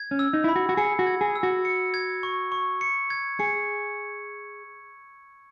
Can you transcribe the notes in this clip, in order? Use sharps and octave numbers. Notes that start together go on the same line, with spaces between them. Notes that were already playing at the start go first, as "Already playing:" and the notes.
Already playing: G#6
C#4
E6
D#4
E4 B5
F#4
F#4
G#4 C#7
F#4
G#6
G#4
E6
F#4
C#7
G#6
C#6
C#6
C#7
G#6
G#4 C#7